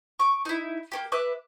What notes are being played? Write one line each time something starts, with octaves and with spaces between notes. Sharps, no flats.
C#6 D6
D#4 E4
A#3 C#4 G4
B4 E5 D6 F#6